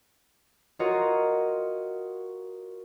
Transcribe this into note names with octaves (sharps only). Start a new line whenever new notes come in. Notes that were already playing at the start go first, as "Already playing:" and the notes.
F4 F#4 A#4 C#5 D#5